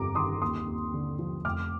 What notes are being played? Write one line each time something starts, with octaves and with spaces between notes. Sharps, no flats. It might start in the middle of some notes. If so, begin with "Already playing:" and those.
Already playing: G1 F2 A#5 D6
D#3 C6 D#6
D#2 C6 D#6
D#2
D3
F3
F1 D6 F6